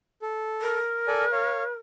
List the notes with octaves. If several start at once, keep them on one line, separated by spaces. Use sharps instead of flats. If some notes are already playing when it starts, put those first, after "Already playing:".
A4
A#4
A4 D5 G#5
C#5 F5